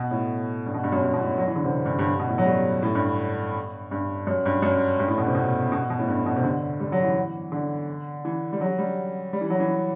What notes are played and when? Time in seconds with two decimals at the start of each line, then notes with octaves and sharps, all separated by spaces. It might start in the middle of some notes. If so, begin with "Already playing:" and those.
Already playing: B2
0.11 A2
0.66 G2
0.74 B2
0.83 G2
0.92 F#2
1.02 G2
1.13 B2
1.20 A2
1.38 F#3
1.48 E3
1.56 D3
1.64 C3
1.85 G2
1.99 G2
2.19 B2
2.28 A2
2.38 F#3
2.46 G3
2.83 A2
2.95 G2
3.91 G2
4.27 F#2
4.46 G2
4.62 F#2
4.99 G2
5.08 A2
5.18 B2
5.26 C3
5.35 B2
5.72 B2
5.90 B2
5.99 A2
6.08 G2
6.26 B2
6.36 C3
6.44 D3
6.80 G3
6.92 F#3
7.04 E3
7.52 D3
8.25 E3
8.53 G3
8.61 F#3
8.79 G3
9.33 G3
9.41 E3
9.50 F#3
9.60 E3